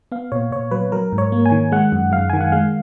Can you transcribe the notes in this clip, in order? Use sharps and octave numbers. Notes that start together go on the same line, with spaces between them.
B3 F5
A#2 C#5
A#2 C#5
F#3 B4
F#3 A#4
G#2
C#5
A#3
G#5
D#3
G#3 F#5
F#2
F#2 F5
D#3 G#5
F#5
G#3 F5